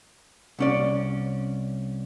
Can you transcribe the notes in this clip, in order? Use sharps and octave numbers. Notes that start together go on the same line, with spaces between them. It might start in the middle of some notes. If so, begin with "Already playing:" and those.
C2 C#4 D5